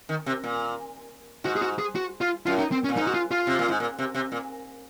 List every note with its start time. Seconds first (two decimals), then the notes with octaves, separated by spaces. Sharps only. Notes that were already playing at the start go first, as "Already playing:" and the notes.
0.09 D#3
0.26 C3
0.44 A#2
1.44 G#2 F#4
1.56 G#4
1.62 F#4
1.79 G#4
1.95 F#4
2.21 F4
2.46 F#2 F4
2.59 D#4
2.72 C4
2.84 C#4
2.89 A#2
2.97 G#2 D#4
3.07 F#4
3.14 F4
3.31 F4
3.47 C3
3.59 A#2
3.69 G#2
3.80 A#2
3.99 C3
4.15 C3
4.32 A#2